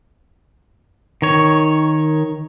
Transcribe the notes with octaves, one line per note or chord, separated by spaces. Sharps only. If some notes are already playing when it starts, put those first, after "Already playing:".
D#3 C#5